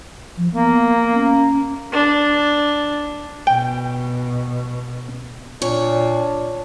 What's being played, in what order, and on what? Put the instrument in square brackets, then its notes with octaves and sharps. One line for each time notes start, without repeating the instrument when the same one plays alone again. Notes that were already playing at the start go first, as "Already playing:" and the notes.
[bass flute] F3
[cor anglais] A#3 [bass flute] B3
[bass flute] C#4
[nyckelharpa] D4
[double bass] B2 [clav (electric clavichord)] G5
[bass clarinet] A#2 [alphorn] D4 [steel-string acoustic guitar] C#5